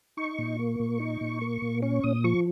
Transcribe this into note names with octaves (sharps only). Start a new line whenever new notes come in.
D#4 C#6
A#2
A#3
A#2
D#4
A#2
A#3
A#2
C#4 C#6
A#2 D#6
F3 C#6